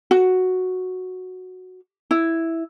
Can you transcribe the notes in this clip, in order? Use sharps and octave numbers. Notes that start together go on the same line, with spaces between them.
F#4
E4